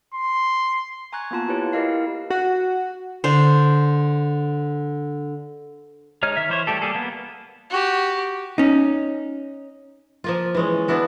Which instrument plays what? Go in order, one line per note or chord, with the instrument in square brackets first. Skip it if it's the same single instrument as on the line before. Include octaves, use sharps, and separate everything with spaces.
[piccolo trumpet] C6
[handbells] G#5 A#5 C#6 F#6 G#6
A#3 B3 F4 A5
E4 F4 G4 B4 C#5
E4 G4 A#4 D#5 F5 C7
[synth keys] F#4
[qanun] D3 C5
[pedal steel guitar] G#3 D#4 C#5 F6
D#3 E5 F6
E3 C5 C#5
G3 A3 G4 A4
G3 A#3 G#4 A4
A#3 B3
[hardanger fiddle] F#4 G4
[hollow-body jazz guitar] C#4 D#4
[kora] F3 A#3 F4
E3 G#3 C#4
B3 D4 E4 F#4